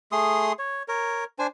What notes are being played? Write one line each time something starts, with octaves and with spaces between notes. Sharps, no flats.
A3 G#4 C6 D#6
C#5
A#4 C#5
D4 C5 G#5